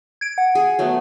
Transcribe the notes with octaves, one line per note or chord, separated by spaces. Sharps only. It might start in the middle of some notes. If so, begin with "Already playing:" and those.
G#6 D7
F#5
G#4
F#3 A3 B3